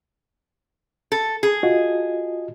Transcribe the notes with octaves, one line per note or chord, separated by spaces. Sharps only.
A4
G#4
F4 F#4 D#5